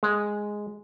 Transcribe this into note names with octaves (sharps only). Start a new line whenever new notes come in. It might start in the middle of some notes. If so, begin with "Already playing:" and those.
G#3